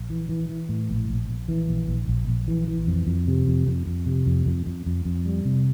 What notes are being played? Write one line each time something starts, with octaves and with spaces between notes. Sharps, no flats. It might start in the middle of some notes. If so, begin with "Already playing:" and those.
Already playing: A#1
E3
E3
E3
A2
A#1
A#1
A#1
E3
A#1
A#1
A#1
A#1
E3
E3
F2
F2
C3
F2
F2
F2
C3
F2
F2
F2
F2
F2
G3
C3